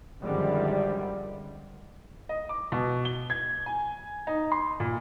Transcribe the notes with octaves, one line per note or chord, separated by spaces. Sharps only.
F#2 D3 D#3 F3 G3 G#3
D#5
D6
B2
G7
G#6
G#5
D#4
C6
A#2